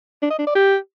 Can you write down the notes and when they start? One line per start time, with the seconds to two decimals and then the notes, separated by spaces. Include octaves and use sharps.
0.22 D4
0.30 D#5
0.39 D4
0.47 D5
0.55 G4